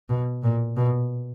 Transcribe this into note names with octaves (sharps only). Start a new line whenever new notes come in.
B2
A#2
B2